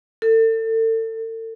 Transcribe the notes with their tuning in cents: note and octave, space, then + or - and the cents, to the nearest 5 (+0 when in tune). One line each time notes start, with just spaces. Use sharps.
A4 +35